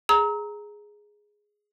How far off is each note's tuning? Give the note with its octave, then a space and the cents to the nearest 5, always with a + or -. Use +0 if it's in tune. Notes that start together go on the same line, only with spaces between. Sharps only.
G#4 +0 A#5 +0 E6 -45